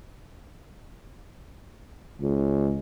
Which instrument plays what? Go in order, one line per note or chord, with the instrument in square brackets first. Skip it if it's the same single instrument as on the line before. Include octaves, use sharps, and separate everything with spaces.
[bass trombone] C#2